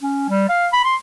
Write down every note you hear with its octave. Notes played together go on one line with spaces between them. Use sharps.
C#4
G3
F5
B5
C6